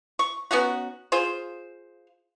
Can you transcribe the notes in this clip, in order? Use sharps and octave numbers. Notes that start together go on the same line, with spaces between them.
C#6
B3 C#4 D#4 F#4
F4 G#4 C5